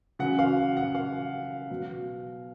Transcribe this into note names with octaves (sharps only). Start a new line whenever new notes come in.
C#3 F#3 F#5
F5
F#5
F5
B2 F#3